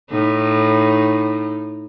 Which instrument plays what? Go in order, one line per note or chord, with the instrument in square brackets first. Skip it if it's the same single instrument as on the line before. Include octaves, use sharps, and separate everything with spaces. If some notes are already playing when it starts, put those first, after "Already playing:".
[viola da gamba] A2 D#4